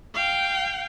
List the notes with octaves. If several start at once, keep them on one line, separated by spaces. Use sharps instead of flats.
F5 G5